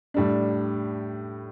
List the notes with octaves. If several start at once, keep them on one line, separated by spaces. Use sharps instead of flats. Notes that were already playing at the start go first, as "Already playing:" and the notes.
A2 G3 D4